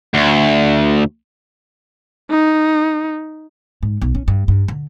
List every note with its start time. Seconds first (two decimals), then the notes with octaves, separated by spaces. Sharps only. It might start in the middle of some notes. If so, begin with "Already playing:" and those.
0.14 D2
2.31 D#4
3.83 G#2
4.02 B1
4.15 C#4
4.28 G2
4.48 G2
4.68 D3